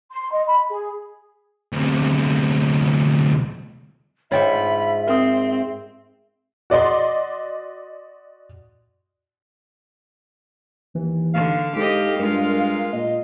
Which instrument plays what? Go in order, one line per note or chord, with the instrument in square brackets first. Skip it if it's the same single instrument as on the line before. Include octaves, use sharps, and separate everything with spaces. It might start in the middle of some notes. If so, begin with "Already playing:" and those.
[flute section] C6
D#5
B5
G#4
[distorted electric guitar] D2 C3
[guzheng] G#2 F4 [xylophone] C#5 G5 [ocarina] E5 [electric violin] B5
[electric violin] C4 [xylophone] A#4 D#6
[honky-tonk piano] F#4 D5 D#5 C6
[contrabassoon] D#2 [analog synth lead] E3
[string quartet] D3 [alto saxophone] F5
[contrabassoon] G#2 [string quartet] G4 D#5 [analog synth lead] A4
[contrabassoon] G2 [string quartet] G#3 F4 [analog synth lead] A#4
[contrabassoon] A#2 [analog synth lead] D#5